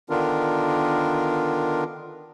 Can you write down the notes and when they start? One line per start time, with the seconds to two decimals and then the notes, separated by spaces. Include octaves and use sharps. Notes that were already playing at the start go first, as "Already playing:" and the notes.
0.10 D3 D#3 B3 D4 F4 A#4